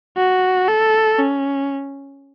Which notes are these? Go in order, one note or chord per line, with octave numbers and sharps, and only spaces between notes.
F#4
A4
C#4